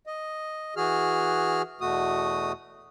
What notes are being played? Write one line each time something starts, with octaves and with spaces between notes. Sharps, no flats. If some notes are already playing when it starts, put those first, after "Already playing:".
D#5
E3 F#4 G#4 F6
E2 B2 A3 F#4 D#6